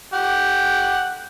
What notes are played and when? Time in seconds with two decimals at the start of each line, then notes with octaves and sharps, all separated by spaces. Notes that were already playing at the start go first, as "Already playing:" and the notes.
0.14 G4 F#5